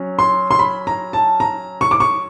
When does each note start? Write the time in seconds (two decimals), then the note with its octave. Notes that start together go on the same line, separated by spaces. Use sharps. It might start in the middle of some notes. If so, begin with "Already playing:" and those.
Already playing: F#3 C#4
0.19 C6
0.51 C6
0.59 B5
0.87 A#5
1.13 A5
1.40 A#5
1.81 C#6
1.91 D6
2.00 C#6